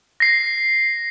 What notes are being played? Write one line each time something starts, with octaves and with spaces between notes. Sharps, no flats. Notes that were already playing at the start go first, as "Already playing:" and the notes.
A#6 C7